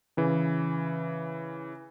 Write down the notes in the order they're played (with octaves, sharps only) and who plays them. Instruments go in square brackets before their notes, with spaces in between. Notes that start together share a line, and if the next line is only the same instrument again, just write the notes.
[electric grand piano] C#3 E3